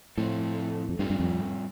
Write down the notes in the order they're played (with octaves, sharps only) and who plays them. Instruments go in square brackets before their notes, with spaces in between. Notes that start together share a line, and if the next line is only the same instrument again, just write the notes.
[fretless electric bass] A2 [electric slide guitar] F3 A3 C4 A4
[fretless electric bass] F2
[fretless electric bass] G2 [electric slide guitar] G3 C4 F4
[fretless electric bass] G2
F2